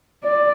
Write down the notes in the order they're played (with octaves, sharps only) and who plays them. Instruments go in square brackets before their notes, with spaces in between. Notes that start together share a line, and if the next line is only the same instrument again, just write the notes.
[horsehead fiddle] D5